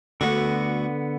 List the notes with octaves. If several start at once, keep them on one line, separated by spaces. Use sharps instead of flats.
D2 D3 B3 F#4 F#5